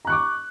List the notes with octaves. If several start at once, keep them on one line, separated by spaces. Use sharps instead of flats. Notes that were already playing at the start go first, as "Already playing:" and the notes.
A#5 C#6 D6 F#6